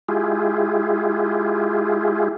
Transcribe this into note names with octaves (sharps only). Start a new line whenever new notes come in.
G#3 E4 F4 G4 G#4